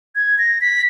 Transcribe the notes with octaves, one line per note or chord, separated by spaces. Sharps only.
G#6
A#6
B6